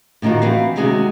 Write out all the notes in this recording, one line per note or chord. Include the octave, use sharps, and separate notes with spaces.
A2 D3 D#3 F4 F#4
E3 C4 F#4 B4 F5
C3 D#3 G#3 C#4 F#4